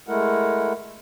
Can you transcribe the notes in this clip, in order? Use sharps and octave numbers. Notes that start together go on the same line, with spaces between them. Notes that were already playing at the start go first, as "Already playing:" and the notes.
G#3 A3 E4 A#4 F#5